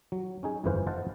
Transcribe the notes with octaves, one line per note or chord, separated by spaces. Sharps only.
F#3
C#4 D#4 G#4
G1 F2 E3 B4 C5 F5
C5 D#5 F5 F#5 A5